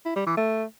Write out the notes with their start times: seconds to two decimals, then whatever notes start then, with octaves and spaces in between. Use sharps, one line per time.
0.05 E4
0.16 G3
0.26 E3
0.37 A3